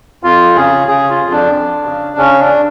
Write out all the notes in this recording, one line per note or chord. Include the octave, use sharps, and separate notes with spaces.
F2 F4
C#3 G#4
C#3 G#4
F4
F2
D4
F2
C#3
C#3 C#4
D4